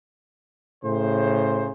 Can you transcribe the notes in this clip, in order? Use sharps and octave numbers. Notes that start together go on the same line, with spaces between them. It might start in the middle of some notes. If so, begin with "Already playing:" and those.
A2 C#3 C5